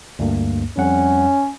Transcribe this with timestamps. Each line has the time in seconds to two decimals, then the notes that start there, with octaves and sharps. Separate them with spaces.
0.19 D2 G2 A#3
0.77 F2 G3 C#4 F#5